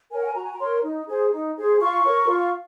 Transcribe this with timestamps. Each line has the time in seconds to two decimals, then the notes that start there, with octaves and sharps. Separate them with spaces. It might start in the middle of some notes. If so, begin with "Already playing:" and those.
0.11 A#4 C#5 G#5
0.18 F#5
0.25 G#5
0.34 F#4 A#5
0.43 G#5
0.52 A#5
0.59 A#4 C#5 C6
0.84 D#4
1.08 G#4 C5
1.32 D#4
1.57 G#4 C5
1.80 F4 C#6
2.05 A#4 C#5
2.29 F4